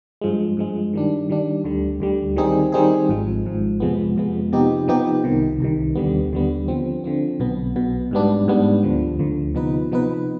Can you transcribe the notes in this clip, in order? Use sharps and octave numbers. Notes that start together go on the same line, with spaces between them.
G2 F3 G#3
G2 F3 G#3
D#3 G3 D4
D#3 G3 D4
D2 D3 G3
D2 D3 G3
D#3 G3 C4 D#4 G#4
D#3 G3 C4 D#4 G#4
G#1 G#2 F3
G#1 G#2 F3
F2 C3 F3 G#3 B3
F2 C3 F3 G#3 B3
C3 F3 B3 D#4 G4
C3 F3 B3 D#4 G4
C2 C3 D#3
C2 C3 D#3
D#2 D3 G3 B3
D#2 D3 G3 B3
D3 F3 C4
D3 F3 C4
B1 B2 B3
B1 B2 B3
G#2 G3 B3 D4
G#2 G3 B3 D4
D2 D3 F3
D2 D3 F3
C3 F3 B3 D#4 B4
C3 F3 B3 D#4 B4